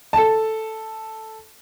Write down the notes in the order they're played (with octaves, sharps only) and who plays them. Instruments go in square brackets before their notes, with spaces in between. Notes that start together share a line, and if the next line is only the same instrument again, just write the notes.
[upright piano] A4 A5